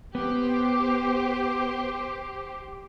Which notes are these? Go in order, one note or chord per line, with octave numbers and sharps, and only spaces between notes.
B3 G4 C5